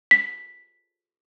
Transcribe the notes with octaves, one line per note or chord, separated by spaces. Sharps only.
B6